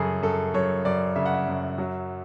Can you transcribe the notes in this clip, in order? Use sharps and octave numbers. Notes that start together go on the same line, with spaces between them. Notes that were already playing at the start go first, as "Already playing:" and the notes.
Already playing: F#2 C#3 F#3 G#4 A4
F#2 A4
F#2 C#5
F#2 D5
C#3 E5
F#5
E5
F#2
F#3